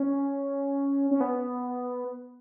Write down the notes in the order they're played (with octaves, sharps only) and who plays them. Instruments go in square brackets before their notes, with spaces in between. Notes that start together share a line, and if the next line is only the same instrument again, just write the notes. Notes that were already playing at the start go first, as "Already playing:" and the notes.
Already playing: [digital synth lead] C#4
C#4
B3